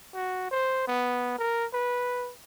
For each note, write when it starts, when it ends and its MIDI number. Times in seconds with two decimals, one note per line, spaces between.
0.14 0.51 66
0.51 0.84 72
0.87 1.34 59
1.38 1.66 70
1.73 2.31 71